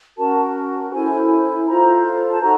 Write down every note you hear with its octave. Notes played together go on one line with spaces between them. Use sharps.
C#4 F#4 A#4 A5
C#4 E4 A4 C5 G#5
F4 A4 C5 A#5
A5
D#4 F#4 A4 A#5